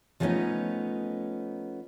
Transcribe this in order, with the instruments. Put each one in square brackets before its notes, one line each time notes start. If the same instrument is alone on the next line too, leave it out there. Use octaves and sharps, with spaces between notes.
[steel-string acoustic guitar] F3 G3 A3 B3 C#4 D#4